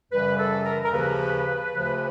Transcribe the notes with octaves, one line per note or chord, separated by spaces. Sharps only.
F#2 C#3 E3 G3 B4
A4
A#4
A#4
D#2 C#3 F3 B4
D2 C#3 F3